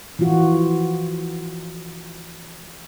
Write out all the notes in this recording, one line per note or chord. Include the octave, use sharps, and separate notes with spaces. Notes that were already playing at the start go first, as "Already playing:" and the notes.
E3 F3 F4 F#4